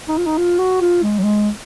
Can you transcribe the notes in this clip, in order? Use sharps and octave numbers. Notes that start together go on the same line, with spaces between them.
D#4
F4
D#4
F4
F#4
F4
G#3
F#3
G#3